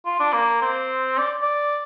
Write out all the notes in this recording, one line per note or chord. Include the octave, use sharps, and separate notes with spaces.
F4
D4
A#3
C4
D5
D5